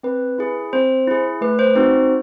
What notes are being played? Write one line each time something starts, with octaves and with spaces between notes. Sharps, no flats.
C4 B4
E4 G#4
C4 C5
E4 G#4
A3 B4
C5
C4 D#4 F#4 C5